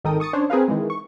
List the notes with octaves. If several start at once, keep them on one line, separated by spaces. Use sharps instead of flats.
G#1 D#3 A4 A#4 G5 D#6
C#6 D#6 A6 C#7
C#4 D4 C5 C#5
C4 G#4 A#4 B4 F5
D#3 E3 G#3
C#6